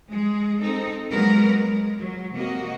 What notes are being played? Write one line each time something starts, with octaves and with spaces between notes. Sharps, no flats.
G#3 G#4
C4 D#4 A4
F#3 G#3 A#3 B3 A#4 B4
G#3
F#3
C3 A#3 F#4 D#5